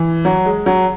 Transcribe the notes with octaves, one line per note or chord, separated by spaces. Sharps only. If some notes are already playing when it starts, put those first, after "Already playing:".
Already playing: E3
F#3
G#3
F#3